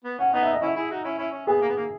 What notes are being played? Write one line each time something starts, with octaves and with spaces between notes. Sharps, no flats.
B3
C#4 F#5
B3 D#4 F#5
E5
D#5
C#4 E4 E5
E4 G#4
D#4 F#4
C#4 E4
C#4 E4
C#4
B3 G#4
A#3
B3
A#3